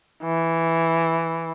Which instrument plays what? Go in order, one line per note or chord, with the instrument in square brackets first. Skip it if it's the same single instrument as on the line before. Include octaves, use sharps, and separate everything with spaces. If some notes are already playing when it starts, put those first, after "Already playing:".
[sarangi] E3